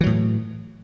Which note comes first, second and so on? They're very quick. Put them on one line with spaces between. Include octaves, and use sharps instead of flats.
E3 F#3 A2